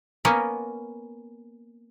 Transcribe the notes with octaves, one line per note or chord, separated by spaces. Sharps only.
A#3 B3 C#4 A#4